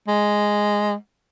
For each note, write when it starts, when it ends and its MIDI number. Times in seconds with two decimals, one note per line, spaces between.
0.08 0.95 56